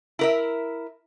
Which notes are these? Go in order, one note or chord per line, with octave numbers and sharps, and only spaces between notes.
E4 A#4 E5